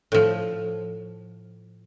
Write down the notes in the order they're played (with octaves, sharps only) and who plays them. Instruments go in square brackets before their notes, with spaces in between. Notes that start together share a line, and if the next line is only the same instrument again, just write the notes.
[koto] A2 F3